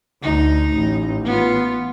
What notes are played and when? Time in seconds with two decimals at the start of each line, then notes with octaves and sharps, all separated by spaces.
0.23 D2 D#4
0.75 A1
1.25 B3 F4